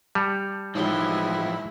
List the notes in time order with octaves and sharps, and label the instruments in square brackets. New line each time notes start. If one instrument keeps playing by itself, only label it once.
[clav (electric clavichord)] G3 [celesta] A5 G6 C#7
[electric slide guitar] A2 E3 F3 [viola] G#3 E4 [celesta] D#4 C#5 G7